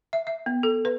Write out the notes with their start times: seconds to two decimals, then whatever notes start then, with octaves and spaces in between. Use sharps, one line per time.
0.13 E5
0.27 E5
0.46 B3
0.63 A4
0.85 B4